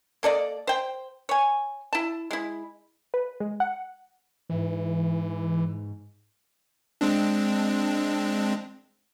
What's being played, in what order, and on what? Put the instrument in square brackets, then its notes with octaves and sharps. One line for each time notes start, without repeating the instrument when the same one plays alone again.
[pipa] A#3 A4 D5 D#5
C5 G5
C#5 G#5
E4 A5
G#3 E4
[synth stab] B4
G#3
F#5
[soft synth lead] G#2 [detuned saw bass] E3
[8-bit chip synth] G#3 C4 D4